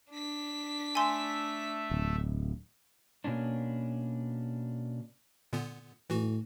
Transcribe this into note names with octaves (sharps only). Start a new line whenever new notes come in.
D4 B6
A3 E5 G#5 C6
D1
B2 A#3 C#4 D4
A#2 D3 B3
A2 E3 F#4